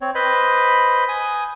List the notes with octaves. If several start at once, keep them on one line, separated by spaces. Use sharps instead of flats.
C4 C#5
B4 C5 D#5 B5
G#5 D#6